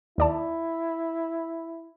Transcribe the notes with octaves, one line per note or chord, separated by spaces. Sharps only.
D#2 E4 D5 A5